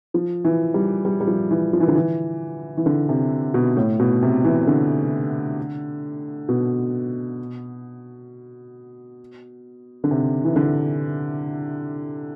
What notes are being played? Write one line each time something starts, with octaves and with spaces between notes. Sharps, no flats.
F3
E3
G3
G3
G3
F3
E3
F3
E3
D3
E3
E3
D3
C3
B2
A2
B2
C3
E3
D3
B2
D3
C3
E3
D3